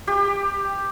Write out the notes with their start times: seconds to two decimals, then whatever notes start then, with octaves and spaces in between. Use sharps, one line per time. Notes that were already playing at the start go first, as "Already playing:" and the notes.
0.07 G4